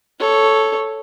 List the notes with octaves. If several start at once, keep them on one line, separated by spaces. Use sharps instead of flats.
A4 C#5